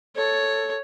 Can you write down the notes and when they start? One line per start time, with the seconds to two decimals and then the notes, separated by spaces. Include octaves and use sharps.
0.16 A4 C#5